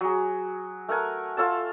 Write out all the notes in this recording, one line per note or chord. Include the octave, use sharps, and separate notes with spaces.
F#3 G#4
A3 A#4 F#5 G#5
F4 A4 C#5 A5